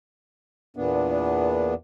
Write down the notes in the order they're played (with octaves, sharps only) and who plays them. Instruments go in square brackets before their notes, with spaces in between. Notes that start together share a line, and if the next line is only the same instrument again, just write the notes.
[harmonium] E2 A#2 B3 D4